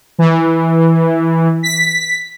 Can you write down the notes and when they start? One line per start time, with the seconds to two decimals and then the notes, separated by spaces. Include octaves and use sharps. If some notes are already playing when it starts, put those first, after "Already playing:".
0.19 E3
1.63 B6